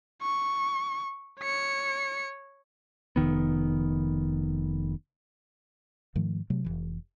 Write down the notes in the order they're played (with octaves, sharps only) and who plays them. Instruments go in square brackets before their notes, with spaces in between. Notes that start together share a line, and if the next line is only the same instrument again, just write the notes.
[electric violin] C#6
C#5 C#7
[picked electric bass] F1 F2 D#3 B3
[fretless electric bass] G#2 D#3 F3 A3
C3 F#3 A3
F1 B1 E3